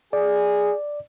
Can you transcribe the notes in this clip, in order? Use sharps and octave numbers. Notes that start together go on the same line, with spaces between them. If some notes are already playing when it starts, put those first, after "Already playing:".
G#4 D5